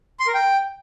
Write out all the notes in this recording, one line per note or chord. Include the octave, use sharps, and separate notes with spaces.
C6
A#4
G5